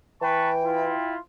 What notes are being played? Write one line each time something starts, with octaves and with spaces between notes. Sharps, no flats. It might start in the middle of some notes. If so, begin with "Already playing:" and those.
E3 B4 G5 A5 C#6
E4 F4 C6